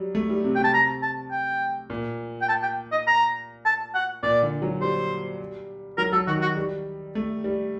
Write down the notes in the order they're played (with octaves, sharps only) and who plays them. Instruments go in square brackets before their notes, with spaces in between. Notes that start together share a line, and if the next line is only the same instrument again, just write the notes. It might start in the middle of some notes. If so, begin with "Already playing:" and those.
Already playing: [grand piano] F#3 G3
A3
G3
C3
[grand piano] C3 [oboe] G5
[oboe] A5
A#5
A5
G5
[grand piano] A#2
[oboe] G5
A5
G5
D#5
A#5
A5
F#5
[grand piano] A#2 [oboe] D5
[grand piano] D3
F#3
[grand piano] G3 [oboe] C5
[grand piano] F#3 [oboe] A#4
[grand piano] F#3 [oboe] A4
[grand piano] D#3 [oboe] F#4
[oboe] F#4
[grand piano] G3
A3
G3